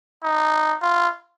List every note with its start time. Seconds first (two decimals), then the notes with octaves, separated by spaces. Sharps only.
0.23 D#4
0.82 F4